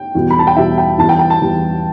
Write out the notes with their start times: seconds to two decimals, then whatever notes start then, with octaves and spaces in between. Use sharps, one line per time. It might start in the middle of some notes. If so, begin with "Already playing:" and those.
Already playing: G5
0.15 E2 B2 G3
0.30 B5
0.39 A5
0.47 G5
0.56 E2 B2 G3 E5
0.78 G5
0.98 E2 E3 G3 A5
1.09 G5
1.19 G5
1.30 A5
1.41 E2 E3 G3